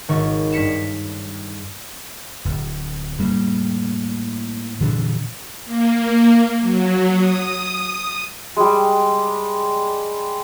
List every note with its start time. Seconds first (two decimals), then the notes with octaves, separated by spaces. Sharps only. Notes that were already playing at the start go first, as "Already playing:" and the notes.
0.08 G#1 D#3 C#5
0.52 G2 B6 C#7 E7
2.45 D1
3.18 A2 G3 A#3
4.80 A#2 D3 E3 D4
5.65 A#3
6.61 F#3
7.19 D#6
8.57 G3 G#3